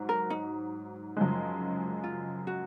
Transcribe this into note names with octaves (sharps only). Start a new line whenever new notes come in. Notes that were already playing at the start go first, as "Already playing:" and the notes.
Already playing: G#2 F#3
A#4
D#4
F#2 C#3 F3 G#3
F4
F#4